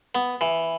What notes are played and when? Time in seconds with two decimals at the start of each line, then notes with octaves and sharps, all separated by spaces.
0.15 B3
0.41 E3